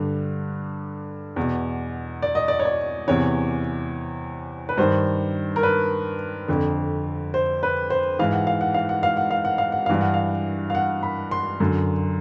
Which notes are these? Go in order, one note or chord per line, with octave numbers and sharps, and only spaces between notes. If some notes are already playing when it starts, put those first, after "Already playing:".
Already playing: G2 D3
E2 B2
D5
D#5
D5
C#5
D5
E2 C3 E3 C#5
B4
G2 D#3 C5
A#4
B4
F2 D3
C5
B4
C5
G#2 E3 F5
F#5
F5
F#5
F5
F#5
F5
F#5
F5
F#5
F5
F#5
G2 E3 F5
F#5
F5
F5
F#5
B5
C6
F#2 D3